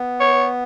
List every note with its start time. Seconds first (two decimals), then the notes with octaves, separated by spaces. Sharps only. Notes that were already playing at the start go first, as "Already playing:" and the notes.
Already playing: B3
0.20 C#5